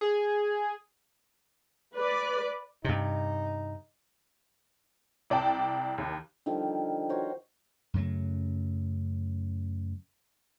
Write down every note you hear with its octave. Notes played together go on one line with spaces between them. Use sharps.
G#4
B4 D5
G2 C3 D#4
C2 D5 G5 A5
D#2
D3 D#3 F3 G3
F#4 A#4 C5 C#5
F#2 C#3 F#3 A3